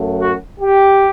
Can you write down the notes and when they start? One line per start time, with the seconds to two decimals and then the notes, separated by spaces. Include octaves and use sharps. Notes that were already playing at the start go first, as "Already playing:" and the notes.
Already playing: F#2 F#3 A3
0.19 F#4
0.60 G4